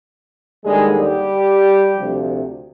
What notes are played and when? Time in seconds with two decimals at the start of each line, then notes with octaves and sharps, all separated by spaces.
0.63 D#2 D3 G3 G#3 G#4
0.97 G3 G4
1.96 D2 C3 F3